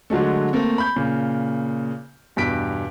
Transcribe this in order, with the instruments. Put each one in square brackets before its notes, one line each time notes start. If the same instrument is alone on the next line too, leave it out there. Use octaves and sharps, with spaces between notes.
[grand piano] D3 F#3 G#3 A3
A3 A#3 C4
B5 G6
A#2 C#3
E2 G2 B2 B6 D7